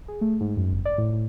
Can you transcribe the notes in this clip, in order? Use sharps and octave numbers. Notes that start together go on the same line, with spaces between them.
G#4
A3
G#2
F#2
G1
D5
A2
A2